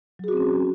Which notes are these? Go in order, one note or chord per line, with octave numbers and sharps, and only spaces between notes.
F#3 C4 C#4 F#4 G#4